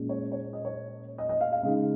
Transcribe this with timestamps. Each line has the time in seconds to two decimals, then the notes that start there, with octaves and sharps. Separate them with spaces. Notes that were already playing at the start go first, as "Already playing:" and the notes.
Already playing: A#2 G#3 C#4
0.09 C#5
0.32 C#5
0.53 D#5
0.65 C#5
1.18 D#5
1.29 D#5
1.41 F5
1.52 F5
1.63 C#3 G#3 D#4